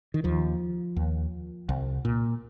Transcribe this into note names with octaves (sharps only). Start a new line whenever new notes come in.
D#3
D#2 F3
D#2
C2
A#2